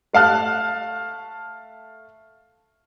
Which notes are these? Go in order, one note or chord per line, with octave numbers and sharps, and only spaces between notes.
A3 F5 A5 F6 F#6